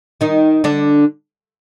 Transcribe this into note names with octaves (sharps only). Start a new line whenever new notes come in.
D#3 D#4
D3 D4